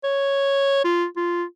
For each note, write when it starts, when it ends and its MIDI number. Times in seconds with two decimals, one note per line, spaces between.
0.04 0.82 73
0.85 1.06 65
1.16 1.44 65